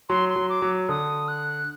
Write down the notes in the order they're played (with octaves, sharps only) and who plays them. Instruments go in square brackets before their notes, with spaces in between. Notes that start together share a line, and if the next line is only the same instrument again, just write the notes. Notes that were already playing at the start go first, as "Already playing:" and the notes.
[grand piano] F#3 [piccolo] C6
[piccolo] C6
[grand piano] F#3
[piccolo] D6
[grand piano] F#3
[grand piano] D3 [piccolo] D#6
[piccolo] F#6